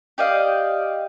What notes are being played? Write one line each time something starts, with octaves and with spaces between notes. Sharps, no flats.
G4 D5 D#5 F5